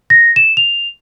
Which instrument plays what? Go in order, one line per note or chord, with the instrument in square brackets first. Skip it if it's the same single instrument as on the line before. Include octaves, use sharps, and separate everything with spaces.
[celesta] A#6
E7
F7